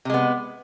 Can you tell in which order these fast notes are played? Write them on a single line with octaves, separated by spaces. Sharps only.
C3 G#3 B3